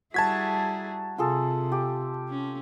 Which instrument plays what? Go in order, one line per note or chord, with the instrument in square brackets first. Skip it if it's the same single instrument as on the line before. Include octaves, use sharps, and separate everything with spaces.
[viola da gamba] G3 E4 G#4 [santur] F#4 A#5 [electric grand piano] A5 G#6 B6
[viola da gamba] C3 [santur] F4 G#4 A4
[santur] G4
[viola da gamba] C#4